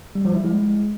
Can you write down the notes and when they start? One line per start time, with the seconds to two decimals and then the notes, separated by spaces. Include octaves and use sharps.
0.15 G3
0.25 F3
0.35 E4
0.44 G#3